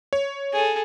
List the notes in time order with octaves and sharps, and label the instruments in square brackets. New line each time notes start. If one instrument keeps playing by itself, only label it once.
[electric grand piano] C#5
[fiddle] G#4 A4